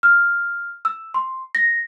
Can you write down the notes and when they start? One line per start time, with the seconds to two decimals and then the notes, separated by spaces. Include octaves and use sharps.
0.03 F6
0.85 E6
1.14 C6
1.55 A#6